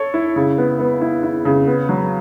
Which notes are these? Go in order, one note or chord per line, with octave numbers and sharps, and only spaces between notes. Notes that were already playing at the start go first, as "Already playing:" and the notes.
Already playing: A4 C#5
E4
C#3
B3
B3
E4
E4
C#3
B3
F#3